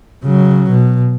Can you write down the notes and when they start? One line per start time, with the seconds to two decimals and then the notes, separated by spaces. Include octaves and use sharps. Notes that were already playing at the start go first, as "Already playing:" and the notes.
0.24 C#3 F#3
0.71 B2